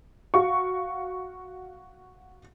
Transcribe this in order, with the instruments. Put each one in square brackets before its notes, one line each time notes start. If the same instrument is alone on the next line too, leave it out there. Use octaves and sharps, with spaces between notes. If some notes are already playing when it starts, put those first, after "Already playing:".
[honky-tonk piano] F#4 F5 C#6